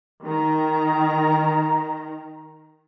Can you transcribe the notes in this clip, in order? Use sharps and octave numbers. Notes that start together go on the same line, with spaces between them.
D#3 A#5